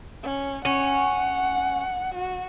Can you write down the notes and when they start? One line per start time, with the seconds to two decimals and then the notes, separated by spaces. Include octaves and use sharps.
0.23 C#4
0.65 C#4 F#5
2.15 F#4